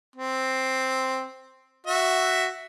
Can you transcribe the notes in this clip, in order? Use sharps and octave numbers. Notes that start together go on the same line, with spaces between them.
C4
F#4 E5